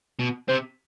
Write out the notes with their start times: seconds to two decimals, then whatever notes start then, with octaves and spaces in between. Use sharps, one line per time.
0.19 B2
0.48 C3 C5